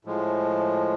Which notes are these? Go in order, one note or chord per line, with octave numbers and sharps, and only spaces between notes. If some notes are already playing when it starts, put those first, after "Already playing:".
A2 F3 G#3